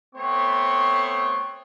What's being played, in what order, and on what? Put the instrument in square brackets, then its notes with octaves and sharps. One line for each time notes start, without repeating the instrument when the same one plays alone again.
[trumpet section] A3 B3 C4 C#5 C6 C#6